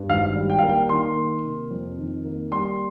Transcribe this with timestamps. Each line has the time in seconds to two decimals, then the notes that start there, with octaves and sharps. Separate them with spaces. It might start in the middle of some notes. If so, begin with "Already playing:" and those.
Already playing: G2
0.09 G#1 F5
0.36 G3
0.50 G5
0.59 A#3 F5
0.69 G5
0.89 D#3 C6
1.17 A#3
1.44 C3
1.71 F2
1.98 D#3
2.24 A#3
2.51 G3 C6